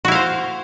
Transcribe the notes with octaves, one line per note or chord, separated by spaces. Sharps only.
E4 F#4 C5 F5